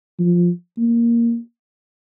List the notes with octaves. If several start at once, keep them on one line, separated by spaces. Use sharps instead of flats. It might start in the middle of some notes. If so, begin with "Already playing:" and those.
F3
A#3